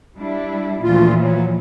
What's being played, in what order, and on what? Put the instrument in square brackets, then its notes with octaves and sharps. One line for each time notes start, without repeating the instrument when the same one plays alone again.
[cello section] G3 D4 E4
[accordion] D2 F4 [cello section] A#2 E3 F3
[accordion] F#3